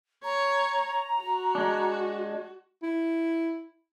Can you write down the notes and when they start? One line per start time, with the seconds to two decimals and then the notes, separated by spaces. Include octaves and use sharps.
0.24 C#5 A#5
1.20 F#4
1.55 G#3 D4
2.83 E4